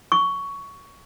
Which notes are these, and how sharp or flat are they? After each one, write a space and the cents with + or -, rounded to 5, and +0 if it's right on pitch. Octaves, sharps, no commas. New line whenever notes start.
C#6 +15